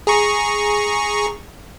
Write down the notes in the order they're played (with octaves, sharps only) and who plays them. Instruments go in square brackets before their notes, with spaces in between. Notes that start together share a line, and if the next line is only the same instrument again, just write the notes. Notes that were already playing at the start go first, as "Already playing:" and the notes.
[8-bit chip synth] G#4 A#5 C#6